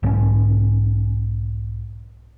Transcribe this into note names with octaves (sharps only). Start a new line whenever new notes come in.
B1 G#2 E3 C#4